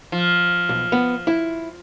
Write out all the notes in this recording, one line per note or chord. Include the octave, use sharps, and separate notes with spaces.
F3
B1
B3
E4